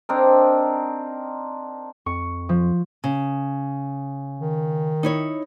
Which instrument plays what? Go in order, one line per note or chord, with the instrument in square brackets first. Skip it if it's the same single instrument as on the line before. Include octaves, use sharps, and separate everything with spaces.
[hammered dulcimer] C4 D4 D#4 A#4
[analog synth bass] F2 [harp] C#6
[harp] F3
[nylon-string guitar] C#3
[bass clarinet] D#3
[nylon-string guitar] D#4 E4 C#5